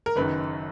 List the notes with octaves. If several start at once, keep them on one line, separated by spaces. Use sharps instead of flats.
A#4
F#1 F#2 D#3 B4